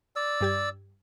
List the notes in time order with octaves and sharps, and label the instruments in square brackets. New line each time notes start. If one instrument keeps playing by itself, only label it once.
[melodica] D5 E6
[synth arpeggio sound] G2 G4 G#6